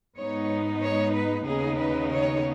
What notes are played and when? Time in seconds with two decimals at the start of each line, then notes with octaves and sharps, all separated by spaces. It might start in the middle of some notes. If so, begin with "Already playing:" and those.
0.17 G#2 G#3 B3 D#4 C#5
0.82 C#5
1.14 B4
1.46 D#2 C#3 B3 D#4 G#4
1.79 B4
2.11 C#5